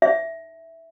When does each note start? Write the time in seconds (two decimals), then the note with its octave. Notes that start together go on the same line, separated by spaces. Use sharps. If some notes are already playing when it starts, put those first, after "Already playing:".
0.02 E5